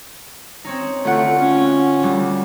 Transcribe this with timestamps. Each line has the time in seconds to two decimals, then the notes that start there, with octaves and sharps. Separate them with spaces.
0.65 C4 C#4 D#4
1.05 D2 A3 F4 F#5
1.38 C#4
2.03 D2 G3